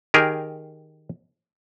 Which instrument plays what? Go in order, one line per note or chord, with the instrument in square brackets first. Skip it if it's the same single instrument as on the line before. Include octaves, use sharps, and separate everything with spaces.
[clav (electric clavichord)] D#3 G4 G#4 A#4